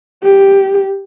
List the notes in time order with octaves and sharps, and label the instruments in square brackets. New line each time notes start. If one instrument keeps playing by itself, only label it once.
[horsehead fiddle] G4